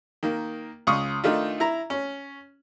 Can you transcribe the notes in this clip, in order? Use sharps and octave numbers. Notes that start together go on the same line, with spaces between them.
D#3 A#3
C#2 C6 C#6 D#6
D#3 A3 D4 D#4 F4
E4 A#5
C#4